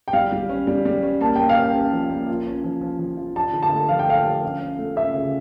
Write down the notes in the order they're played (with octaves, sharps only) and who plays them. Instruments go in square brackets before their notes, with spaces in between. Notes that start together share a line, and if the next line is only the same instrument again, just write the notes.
[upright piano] G5
[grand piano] G3 [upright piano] F5
[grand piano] G3
C#4
G3
G3
C#4
[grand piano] A#3 [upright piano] A5
[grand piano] A#3 [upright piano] G5
[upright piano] F5
[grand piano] C#4
[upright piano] G5
[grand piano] C#4
F3
A#3
F4
C#4
F3
F3
F3
F4
[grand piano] D4 [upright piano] A5
[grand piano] D3
[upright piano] A5
[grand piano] A3
[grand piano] F3 [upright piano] F5
[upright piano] G5
[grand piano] A3 [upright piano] F5
[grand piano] F3
C#4
C#4
A3
[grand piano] C#4 [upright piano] E5
[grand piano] C#3